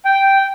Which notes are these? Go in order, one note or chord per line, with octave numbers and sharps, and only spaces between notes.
G5